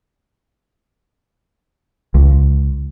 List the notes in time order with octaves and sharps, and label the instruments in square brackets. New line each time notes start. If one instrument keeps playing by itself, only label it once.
[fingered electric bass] C#2